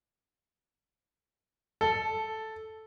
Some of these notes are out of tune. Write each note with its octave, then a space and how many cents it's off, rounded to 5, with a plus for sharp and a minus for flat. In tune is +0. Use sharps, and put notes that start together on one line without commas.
A4 -5